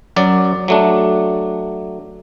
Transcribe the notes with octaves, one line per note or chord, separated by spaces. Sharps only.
F#2 F#3 D5
F#3 A3 D4